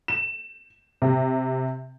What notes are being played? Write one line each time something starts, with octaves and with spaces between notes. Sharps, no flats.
E7
C3